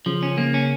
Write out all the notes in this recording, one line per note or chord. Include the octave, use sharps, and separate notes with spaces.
C#3 F3
C#4
A#3
C#4